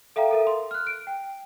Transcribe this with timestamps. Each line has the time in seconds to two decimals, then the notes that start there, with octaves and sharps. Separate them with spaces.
0.16 A4 E5 F5 G5 A#5
0.31 A4 A#4 E5
0.47 C6
0.71 F6 F#6
0.87 D7
1.07 G5